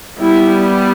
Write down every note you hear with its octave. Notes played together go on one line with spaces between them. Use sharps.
G3 B3 E4